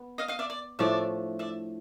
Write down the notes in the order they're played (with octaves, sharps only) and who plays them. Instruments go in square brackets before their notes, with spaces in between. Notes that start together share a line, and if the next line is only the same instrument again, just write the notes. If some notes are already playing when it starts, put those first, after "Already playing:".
Already playing: [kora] B3
[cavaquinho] D#5 F5
D#5 F5
D5 E5
D5
[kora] A2 F3 A3 D4 [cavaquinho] D5 E5
[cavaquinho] D5 E5